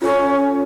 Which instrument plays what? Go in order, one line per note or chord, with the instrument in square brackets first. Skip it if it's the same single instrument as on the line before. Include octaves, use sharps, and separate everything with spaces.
[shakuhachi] C#4 [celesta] F4 A4 C#5